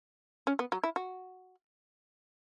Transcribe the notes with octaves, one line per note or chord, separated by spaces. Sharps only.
C#4
B3
F#3
E4
F#4